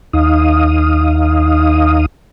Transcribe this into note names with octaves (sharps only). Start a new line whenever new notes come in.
D#2 D#4 F5 D#6